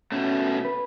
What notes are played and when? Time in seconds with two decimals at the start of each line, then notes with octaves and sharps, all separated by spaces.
0.12 B2 A3 C#4
0.65 B4